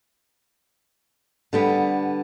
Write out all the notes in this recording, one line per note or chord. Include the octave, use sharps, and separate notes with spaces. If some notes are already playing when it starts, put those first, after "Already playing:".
D3 G3 B3